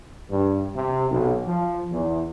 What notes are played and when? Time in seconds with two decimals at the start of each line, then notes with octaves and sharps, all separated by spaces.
0.30 G2
0.76 C3
1.11 B1
1.46 F3
1.92 E2